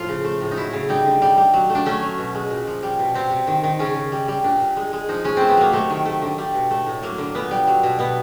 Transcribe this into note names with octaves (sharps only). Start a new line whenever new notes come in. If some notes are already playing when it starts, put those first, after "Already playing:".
Already playing: A2 F3 F4
C#3
A3
A2
D#4
F#3 E4
C#3
G3 D#4
D3
G3
G3
F#3
A3
D4
A3 C#4
F#3
B2
G#3
A#2
F3
G3
B2
C3 C4
C3
D#3
D#3
C#3 C#4
C#3
G3
G3
A#2 D4
A#2
G#3
G#3
F3 D#4
G#3 C#4
A3 C4
B3
F#3 A#3
C3 A3
D#3
A3
D3
G3
B2
A3
A2
F#3 A#3
D3
A#2 B3
G3
F#3
B2
B2 B3